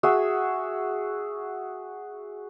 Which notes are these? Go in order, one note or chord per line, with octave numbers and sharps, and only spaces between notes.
F#4 G#4 E5